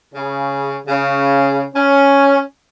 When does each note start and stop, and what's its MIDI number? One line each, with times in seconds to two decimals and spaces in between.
0.14 0.76 49
0.87 1.64 49
1.75 2.39 61